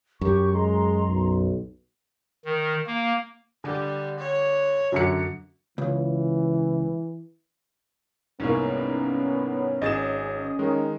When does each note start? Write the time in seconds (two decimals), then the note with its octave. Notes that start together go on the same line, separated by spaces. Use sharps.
0.21 F#2 G4 C#6
0.53 G#3 A#5 C6
1.08 B1
2.45 D#3
2.87 A#3
3.64 D3 G3
4.19 C#5
4.92 F#2 D3 C#7
5.78 C#2 E3
8.40 C2 G#2 A#3 B3 C#4
9.82 G#1 G#4 D#5 A6 E7
10.59 D#3 G#3